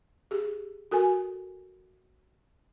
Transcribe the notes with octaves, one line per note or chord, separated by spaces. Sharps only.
G4 G#4
F#4 A4 A#4 G#5